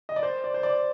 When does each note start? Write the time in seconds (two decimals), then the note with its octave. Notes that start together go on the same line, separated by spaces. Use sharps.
0.09 D#5
0.16 D5
0.23 C5
0.44 D5
0.54 C5
0.63 D5